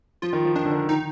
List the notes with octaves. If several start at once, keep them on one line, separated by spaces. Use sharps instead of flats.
F3 F4
D#3
F3
D#3 D4
D3
D#3
D#3 D#4